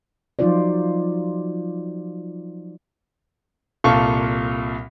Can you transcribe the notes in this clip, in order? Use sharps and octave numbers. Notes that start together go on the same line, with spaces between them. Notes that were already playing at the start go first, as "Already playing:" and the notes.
F3 F#3 D#4 F4 C5 D5
C2 A#2 A4 F5 C#6